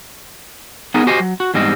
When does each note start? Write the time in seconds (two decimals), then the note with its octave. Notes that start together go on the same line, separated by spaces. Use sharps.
0.94 B3 D#4 G#4 A#4 D#5
1.07 F#4 G4 C5 D#5 G#5
1.20 F#3
1.40 F#4
1.54 E2 G#2 G3 C4 D#5